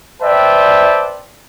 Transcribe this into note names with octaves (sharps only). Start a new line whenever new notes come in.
B4 C5 D5 E5 G5 A5